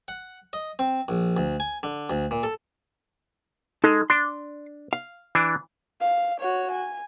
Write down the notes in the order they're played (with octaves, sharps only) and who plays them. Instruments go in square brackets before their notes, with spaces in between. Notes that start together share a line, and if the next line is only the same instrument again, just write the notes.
[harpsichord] F#5
D#5
C4
A#1
D2
G#5
D3
D2
A#2
A4
[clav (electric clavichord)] G#3 [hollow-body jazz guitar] D#4 A4
[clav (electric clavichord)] D4 [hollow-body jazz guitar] C6
[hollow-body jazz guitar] F5
[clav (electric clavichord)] E3 D4
[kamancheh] F5
F#4 C#5
G#5